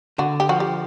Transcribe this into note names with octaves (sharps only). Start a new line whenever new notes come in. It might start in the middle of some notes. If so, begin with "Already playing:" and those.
D3 F#4
G4
F3 F#4
G4